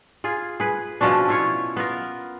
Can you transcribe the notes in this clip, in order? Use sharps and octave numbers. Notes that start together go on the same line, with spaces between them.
F4 G#4
G#4 B4
B2 F3 C#4 D4
E4 F4 C#5
B3 F4 A#4